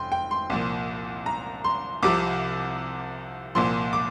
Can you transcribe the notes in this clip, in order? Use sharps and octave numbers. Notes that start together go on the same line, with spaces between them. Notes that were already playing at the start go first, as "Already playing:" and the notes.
Already playing: F1 G5 C6
G5
C6
C2 A#2 F3
A#5
C6
C2 C3 F3 D6
C2 A#2 F3 C6
D6